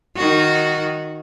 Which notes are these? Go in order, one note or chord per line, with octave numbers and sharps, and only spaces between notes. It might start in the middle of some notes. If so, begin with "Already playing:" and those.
D#3 F#4